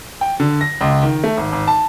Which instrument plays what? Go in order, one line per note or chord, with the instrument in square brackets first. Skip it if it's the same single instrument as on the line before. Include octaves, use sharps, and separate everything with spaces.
[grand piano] G5
D3
A#6
C#2
D#3
A3
G#1
G#1
A5